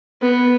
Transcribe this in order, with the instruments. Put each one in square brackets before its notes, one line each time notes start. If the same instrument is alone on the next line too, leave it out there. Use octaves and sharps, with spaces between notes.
[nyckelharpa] B3